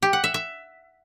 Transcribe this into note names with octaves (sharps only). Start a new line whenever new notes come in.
G4
F#5
E5
E5